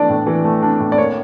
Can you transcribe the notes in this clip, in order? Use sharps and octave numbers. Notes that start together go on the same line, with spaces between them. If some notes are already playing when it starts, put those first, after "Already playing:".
Already playing: E3 A3 D4 D5
A2
E3
A3
D4
A2
D5
A#3 C#5